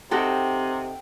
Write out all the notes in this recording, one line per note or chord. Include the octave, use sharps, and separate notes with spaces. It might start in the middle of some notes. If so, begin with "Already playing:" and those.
C3 D#4 F#4 A4 G5